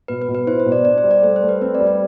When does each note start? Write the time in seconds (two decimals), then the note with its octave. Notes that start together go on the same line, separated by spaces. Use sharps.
0.08 B2 B4
0.22 B4
0.28 B2
0.35 B4
0.47 E4 C5
0.60 C5
0.66 B2
0.72 D5
0.85 D4 D5
0.98 C5
1.04 G3
1.11 D5
1.23 A3 C5
1.36 C5
1.42 A3
1.49 B4
1.61 C4 B4
1.75 D5
1.80 G3
1.87 D5